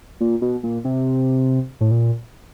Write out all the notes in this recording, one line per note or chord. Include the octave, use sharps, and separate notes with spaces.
A#2
B2
A#2
C3
A2
A#2